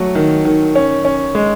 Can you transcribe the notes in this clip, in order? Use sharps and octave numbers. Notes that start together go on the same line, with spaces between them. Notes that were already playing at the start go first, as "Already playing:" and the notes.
Already playing: F#3 A3
D#3
D#3
C#4
C#4
G#3